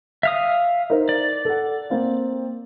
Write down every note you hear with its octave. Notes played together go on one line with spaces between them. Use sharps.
E5 F5 D#6
D#4 A#4 C5
D5
A4 F#5
A#3 C4 F5